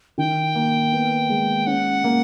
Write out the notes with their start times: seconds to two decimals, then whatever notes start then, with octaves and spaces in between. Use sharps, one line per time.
0.18 D#3 G5
0.55 A#3
0.92 B3
1.30 G#3
1.67 C#4 F#5
2.04 A#3